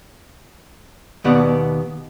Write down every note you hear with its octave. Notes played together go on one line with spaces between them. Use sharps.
D#2 B2 B3 D5 F#5